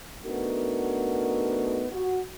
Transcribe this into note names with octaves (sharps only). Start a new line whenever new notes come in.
A3 B3 D4 D#4 F#4 A#4
F#4